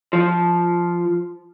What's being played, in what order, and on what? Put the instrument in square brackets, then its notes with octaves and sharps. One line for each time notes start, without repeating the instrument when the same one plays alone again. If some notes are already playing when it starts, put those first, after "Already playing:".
[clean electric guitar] F3